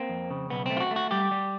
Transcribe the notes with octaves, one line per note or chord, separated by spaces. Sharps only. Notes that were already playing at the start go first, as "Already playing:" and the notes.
Already playing: A#3 C4
F2
C#3
B1 B3
A3 C4
F4
F#4
A3
F#4
G3 G4
G3